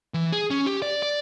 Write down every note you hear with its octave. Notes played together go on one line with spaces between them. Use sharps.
E3
G#4
C#4
G4
D5
D5